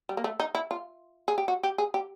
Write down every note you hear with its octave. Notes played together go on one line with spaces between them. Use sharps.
G3
A#3
A3
D#4
E4
F4
G#4
G4
F#4
G4
G#4
G4